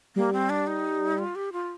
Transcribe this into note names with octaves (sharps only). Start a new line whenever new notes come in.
G3 A#3
C4
D4
D#4
F4
G4
F4